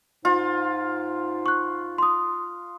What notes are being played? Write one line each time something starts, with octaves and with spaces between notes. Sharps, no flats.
G#2 F4
C#6 F#6
C6 D#6